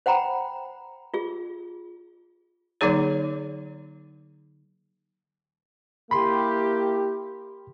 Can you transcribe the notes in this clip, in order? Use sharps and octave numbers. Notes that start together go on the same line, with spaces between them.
C5 F#5 G5 A#5 B5
F4 G#4
D3 F#3 A#3 D#4 G#4 C#5
A#3 E4 G4 B5 C6